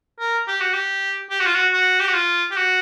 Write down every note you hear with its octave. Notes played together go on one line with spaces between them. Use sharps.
A#4
G4
F#4
G4
G4
F#4
F4
F#4
F#4
G4
F#4
F4
G4
F#4